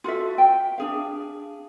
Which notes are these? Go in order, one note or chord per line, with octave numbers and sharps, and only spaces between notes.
F4 F#4 A4 E5
G5
D4 G#4 F5